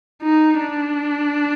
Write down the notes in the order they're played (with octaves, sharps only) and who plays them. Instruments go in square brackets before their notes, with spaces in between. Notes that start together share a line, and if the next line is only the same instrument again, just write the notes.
[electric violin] D#4
D4